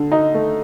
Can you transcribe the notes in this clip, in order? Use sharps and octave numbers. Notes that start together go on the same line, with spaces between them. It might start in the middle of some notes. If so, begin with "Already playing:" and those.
Already playing: D3
D#4
A3